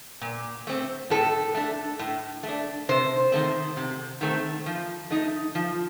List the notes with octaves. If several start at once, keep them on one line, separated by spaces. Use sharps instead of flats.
A#2
A3 C4
A2 A4
A3 D4
A2
A3
D4
C3 C5
D#3 A3 C4
C3
D#3 A3 C4
F3
A3 D#4
F3